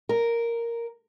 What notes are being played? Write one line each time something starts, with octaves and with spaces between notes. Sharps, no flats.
A#4